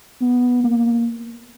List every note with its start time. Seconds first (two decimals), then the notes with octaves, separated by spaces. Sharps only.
0.21 B3
0.64 A#3